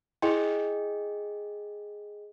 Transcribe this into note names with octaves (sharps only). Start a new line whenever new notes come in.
E4 G#4 D#5 G5